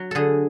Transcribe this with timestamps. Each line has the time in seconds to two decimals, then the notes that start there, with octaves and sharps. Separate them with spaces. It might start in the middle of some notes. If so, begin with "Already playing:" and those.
Already playing: F#3
0.11 D3 G#4 A4